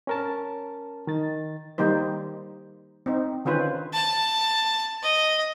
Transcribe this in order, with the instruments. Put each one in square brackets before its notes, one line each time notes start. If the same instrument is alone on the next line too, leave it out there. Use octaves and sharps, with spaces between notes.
[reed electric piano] C#4 A#4 A5
D#3 A6
[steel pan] D#3 G3 A#3 D#4 C5
C4 D#4
D3 D#3 C#4 F4 B4 C5
[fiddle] A5
D#5